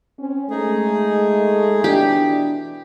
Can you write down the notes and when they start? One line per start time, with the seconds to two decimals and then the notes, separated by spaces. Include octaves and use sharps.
0.19 C4 C#4
0.50 G#3 A3 D#4 G#4
1.84 B2 E3 D4 G4